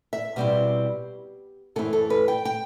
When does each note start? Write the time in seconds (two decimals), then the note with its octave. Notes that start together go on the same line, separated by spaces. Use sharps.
0.13 E5
0.36 B2 G3 C4 E4 G4
1.76 F#2 E3 A3 C4 E4 A4
1.93 A4
2.10 B4
2.28 G5
2.45 G5